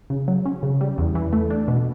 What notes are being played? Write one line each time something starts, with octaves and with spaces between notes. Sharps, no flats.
C#3
F#3
C#4
C#3
G3
E2
E3
A3
D4
B2